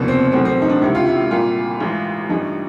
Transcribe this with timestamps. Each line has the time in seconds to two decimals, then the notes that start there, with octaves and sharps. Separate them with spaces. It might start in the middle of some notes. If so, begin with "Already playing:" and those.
Already playing: F1 D#2 C#3 B3
0.08 C4
0.32 B1 A2 E3 C4
0.45 C4
0.62 D#4
0.69 D4
0.81 C#2 C3 D#3 E4
0.95 F4
1.06 E4
1.31 C2 A#2 F4
1.80 A1 G#2 E3
2.29 A1 G2 E3 D#4